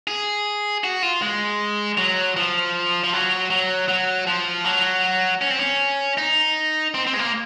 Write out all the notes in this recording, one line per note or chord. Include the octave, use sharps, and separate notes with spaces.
G#4
F#4
F4
G#3
F#3
F3
F3
F#3
F#3
F#3
F3
F#3
C#4
C4
C#4
D#4
C4
C4
G#3
A#3